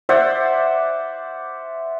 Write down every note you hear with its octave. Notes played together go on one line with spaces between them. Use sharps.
C5 D5 E5 F#5